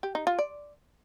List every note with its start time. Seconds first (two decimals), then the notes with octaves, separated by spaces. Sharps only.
0.03 G4
0.15 D#4
0.27 F4
0.39 D5